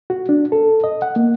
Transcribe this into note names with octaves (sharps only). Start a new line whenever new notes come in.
F#4
D4
A4
D#5
F#5
A#3